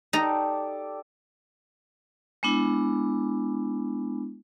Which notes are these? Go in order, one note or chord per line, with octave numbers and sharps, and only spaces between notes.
D#4 G4 A4 D5 A#5
G#3 B3 D4 E4